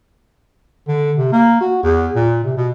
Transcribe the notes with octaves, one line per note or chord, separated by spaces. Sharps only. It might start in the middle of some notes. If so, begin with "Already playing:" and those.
D3
C3
A#3
F#4
E2
A#2
C3
B2